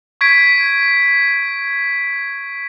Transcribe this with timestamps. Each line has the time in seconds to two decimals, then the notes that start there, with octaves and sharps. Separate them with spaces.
0.21 C#6 G#6 B6 D7